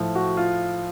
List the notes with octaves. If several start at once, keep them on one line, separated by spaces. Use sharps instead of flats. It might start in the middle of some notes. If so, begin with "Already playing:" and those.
Already playing: A2 F3
F#4
F4